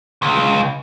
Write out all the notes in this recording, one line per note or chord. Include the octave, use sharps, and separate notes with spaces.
C#2